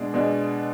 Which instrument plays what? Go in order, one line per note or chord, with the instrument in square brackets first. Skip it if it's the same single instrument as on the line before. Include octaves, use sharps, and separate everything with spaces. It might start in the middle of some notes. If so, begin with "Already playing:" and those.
Already playing: [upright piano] B2 G#3 D4
B2 G#3 D4